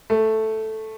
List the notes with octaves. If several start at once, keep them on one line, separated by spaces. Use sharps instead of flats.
A3